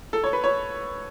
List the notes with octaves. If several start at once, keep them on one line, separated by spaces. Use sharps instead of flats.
A4
C#5
B4
C#5